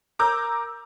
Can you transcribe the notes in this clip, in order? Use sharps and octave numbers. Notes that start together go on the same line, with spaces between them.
A#4 A#5 D6 E6 G6